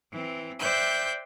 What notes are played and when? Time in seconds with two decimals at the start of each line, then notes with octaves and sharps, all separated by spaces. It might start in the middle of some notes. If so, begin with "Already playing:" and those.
0.11 E3 C4
0.59 C5 D5 E5 G5 F#6 G6